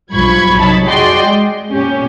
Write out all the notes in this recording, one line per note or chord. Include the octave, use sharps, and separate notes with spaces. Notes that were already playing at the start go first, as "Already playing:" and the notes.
B1 G2 F3 B5 C#6 G#6
C3 F#3 D#4 C#5 A5 B5
F#4 G#4 D5 D#5 G5 C6
G#3
A#2 C#4 G4